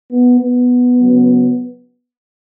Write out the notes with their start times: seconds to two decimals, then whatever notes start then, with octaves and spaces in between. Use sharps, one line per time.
0.11 B3
0.40 B3
0.99 C#3 F#3